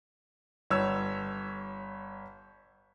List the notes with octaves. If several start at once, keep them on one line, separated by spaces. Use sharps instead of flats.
G1 C#5 E6